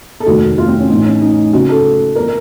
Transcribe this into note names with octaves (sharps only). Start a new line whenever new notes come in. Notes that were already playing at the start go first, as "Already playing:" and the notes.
A4
F1 D#2 D#3 A3 F#4
F4
C4
C#4
A1 A2 F3 D#4
C#4
D#4
F#1 F#2 C#3 F#4
A4
F3 A#4